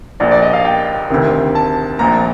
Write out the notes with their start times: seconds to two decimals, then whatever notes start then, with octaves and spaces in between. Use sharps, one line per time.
0.20 A#1 A#2 D5
0.31 D5
0.42 D#5
0.53 F5
0.65 G5
1.10 D2 C3 D#3
1.55 A5
1.99 A#1 A#2 A#5